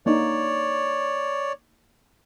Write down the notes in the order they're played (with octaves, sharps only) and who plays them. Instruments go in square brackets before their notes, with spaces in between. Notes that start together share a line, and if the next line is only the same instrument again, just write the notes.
[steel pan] A#3 D4 D#4 [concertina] C#5 D5